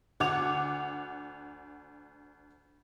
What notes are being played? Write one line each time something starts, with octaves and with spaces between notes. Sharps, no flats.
D2 F#5 D6 G#6 F7